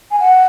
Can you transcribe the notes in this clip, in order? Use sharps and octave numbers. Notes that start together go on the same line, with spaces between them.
G#5
F#5